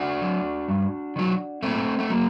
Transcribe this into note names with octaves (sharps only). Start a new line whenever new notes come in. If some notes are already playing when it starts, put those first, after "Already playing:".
Already playing: D4 F#4
F#3
G2
D#3 F#3
A#2 A3 C4
A3
F#3 A#3